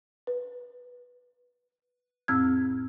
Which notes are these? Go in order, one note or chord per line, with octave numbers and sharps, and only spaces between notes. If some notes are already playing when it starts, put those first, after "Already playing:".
B4
F2 A2 C4 E6 F6 G#6